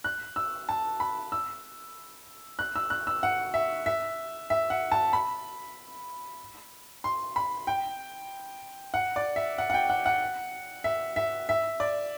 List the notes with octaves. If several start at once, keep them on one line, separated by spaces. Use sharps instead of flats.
F#6
E6
A5
B5
E6
F#6
E6
F#6
E6
F#5
E5
E5
E5
F#5
A5
B5
C6
B5
G5
F#5
D5
E5
F#5
F#5
G5
F#5
F#5
E5
E5
E5
D5